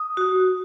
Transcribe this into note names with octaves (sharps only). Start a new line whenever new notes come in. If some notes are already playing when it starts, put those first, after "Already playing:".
Already playing: D#6
F#4